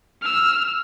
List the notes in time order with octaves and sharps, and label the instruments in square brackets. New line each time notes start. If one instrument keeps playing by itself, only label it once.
[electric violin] E6 F6